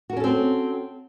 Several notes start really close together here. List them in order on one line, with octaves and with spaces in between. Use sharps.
F#4 A#4 C#4 A4 C4